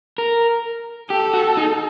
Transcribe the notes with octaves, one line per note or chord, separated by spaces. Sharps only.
A#4
G4 A4
F#4
D#4